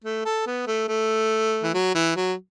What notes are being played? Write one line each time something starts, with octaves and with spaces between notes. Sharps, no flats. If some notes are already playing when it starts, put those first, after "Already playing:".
A3
A4
B3
A3
A3
E3
F#3
E3
F#3